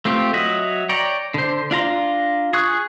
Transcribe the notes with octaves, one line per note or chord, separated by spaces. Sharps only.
A3 C4 F4 G4
F#3 D#5 E5 F#5
C#5 D5 G5 A#5
D3 C5
D4 F4 A#5 C6
G#4 C#6 F#6